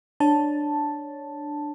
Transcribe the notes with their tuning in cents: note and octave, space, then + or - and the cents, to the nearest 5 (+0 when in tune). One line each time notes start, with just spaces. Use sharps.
D4 +10 C#5 +0 A5 +0